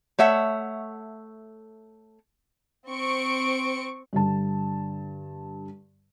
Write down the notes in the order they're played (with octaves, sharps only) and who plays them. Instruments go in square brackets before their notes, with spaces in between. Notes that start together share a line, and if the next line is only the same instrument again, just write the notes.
[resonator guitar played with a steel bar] A3 C#5 E5 F#5
[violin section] C4 C#6 D7
[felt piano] G2 D3 A5